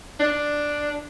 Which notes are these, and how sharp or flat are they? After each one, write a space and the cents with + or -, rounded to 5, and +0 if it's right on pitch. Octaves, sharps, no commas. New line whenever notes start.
D4 +5